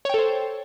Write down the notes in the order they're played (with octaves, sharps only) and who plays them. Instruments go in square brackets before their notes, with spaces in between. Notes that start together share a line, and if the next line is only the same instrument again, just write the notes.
[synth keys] C#5
G5
A4
C5